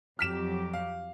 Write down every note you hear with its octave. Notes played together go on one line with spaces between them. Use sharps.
F2 F#3 G4 F6 B6 E7
F5